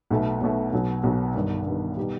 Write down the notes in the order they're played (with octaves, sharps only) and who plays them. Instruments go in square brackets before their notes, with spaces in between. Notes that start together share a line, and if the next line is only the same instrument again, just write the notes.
[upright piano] B1 B2 A3
B1 B2 A3
B1 B2 F#3
B1 B2 F#3
G1 G2 D#3
G1 G2 D#3
B2 G3 D#4 G4